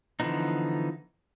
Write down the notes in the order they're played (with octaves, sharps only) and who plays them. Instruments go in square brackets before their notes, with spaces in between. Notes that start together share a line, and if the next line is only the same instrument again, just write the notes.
[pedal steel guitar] D3 E3 F3 B3 D#4